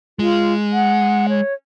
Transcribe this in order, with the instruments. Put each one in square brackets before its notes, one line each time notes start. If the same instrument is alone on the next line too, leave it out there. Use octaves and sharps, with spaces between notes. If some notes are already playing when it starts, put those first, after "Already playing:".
[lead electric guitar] G#3 [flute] F4
[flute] F#5
C#5